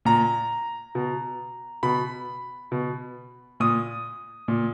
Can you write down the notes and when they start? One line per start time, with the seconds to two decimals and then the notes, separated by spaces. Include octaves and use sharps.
0.05 A#2 A#5
0.95 B2
1.83 B2 B5
2.72 B2
3.60 A#2 D#6
4.48 A#2